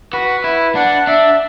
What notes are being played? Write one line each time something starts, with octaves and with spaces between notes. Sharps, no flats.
F#4 B4
E4
D4 F#5
D4 E5